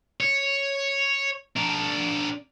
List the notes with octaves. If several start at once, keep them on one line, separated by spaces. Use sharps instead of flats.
C#5
D4 A#4